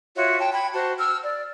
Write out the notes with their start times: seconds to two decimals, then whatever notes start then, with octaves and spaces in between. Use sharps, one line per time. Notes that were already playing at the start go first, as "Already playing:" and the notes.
0.16 F4 F#4 C#5 E5
0.39 G5 A5
0.53 G5 B5 G#6
0.74 F#4 C5 A5
0.99 E6 F6
1.22 D5